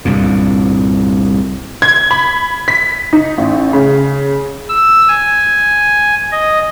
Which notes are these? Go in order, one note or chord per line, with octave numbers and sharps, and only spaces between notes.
C2 G2 A#2
G#6
B5
B6
D#4
A1
C#3
E6
G#5
D#5